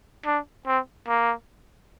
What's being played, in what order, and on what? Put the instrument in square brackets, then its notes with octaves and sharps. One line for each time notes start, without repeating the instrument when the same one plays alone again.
[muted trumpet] D4
C4
A#3